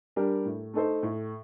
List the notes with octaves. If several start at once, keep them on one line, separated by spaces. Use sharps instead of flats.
G3 D4 G4 A#4
A2
A3 D#4 A4 C5
A2